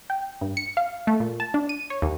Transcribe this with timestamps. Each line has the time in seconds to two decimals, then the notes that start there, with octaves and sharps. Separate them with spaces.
0.10 G5
0.41 G2
0.57 C#7
0.77 F5
1.07 A3
1.20 A#2
1.40 A5
1.54 D4
1.69 D#7
1.90 C#5
2.02 D#2